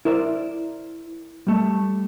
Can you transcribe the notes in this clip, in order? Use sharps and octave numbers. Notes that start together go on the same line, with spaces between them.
E4 A#4 C5 D5
G3 A3